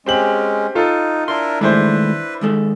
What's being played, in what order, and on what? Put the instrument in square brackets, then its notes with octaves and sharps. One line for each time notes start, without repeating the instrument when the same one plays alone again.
[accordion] G#3 C#4 [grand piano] C4 G4 F#7
[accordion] D#4 [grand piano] F4 A4
[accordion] D4 E4 A#4 [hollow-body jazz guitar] C6
[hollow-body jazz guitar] D#2 G#3 A3 [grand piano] D4 E4 C5 [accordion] B4
[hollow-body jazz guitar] D#2 G#3 A4